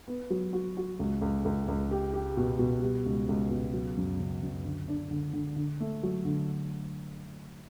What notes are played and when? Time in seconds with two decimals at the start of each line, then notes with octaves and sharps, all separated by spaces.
0.08 B3
0.30 F#3
0.53 F#4
0.77 F#4
0.99 C#2
1.22 C#2
1.45 C#2
1.68 C#2
1.91 G4
2.14 G4
2.37 B2
2.59 B2
2.82 G3
3.06 C#2
3.29 C#2
3.50 B2
3.73 F#3
3.97 F#2
4.20 C#3
4.43 F#2
4.65 D3
4.88 D4
5.11 D3
5.33 D3
5.56 D3
5.80 A3
6.03 F#3
6.25 D3